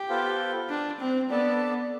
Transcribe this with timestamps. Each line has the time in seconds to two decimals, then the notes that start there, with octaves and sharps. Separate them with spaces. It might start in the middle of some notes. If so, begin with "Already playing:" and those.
Already playing: G4
0.09 B3 F4 A4 C5 F5
0.69 D4
1.00 C4
1.30 B3 D4 A4 D5 A5